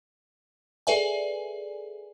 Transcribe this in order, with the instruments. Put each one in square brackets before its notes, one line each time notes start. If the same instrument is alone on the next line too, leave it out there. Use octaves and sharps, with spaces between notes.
[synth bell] G#4 A4 B4 D5 E5 G#5